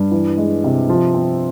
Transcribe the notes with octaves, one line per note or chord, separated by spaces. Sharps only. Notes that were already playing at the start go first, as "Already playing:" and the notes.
Already playing: G2
E3
G#3
C3
F3
C4